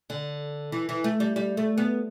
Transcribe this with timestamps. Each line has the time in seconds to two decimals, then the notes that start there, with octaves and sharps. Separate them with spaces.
0.10 D3
0.72 E3
0.89 E3
1.04 A3
1.20 G3
1.36 G3
1.57 A3
1.78 B3